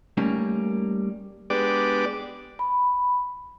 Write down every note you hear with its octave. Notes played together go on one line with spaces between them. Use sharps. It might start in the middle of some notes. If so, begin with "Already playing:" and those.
G3 A3 A#3 C#4 D#4
G#3 B3 D4 G4 D5 D6
B5